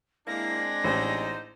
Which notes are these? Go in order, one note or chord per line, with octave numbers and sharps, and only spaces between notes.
G#3 A#3 C4 D4 E4 A#6
A1 D#4 C5